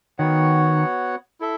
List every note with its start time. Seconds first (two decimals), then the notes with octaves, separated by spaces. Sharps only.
0.18 D#3 B3 F#4 C#5 F#5
1.40 E4 A4 E5